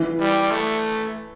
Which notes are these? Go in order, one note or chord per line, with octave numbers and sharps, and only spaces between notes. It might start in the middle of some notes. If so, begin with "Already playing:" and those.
Already playing: E3
G3
A3